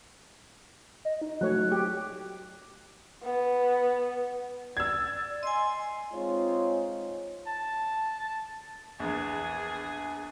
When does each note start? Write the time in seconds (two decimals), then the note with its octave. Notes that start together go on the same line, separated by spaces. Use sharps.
1.05 D#5
1.21 D#4
1.41 F#3 A3 C#5 F#6
1.72 G4
3.23 B3
4.77 D5 E6 G#6
5.43 D#5 G#5 C6
6.13 G#3 C4 D#4 F4 C#5
7.47 A5
9.00 A#1 E2 G#4